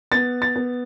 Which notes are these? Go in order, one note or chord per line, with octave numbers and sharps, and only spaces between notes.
B3 A6
A6
B3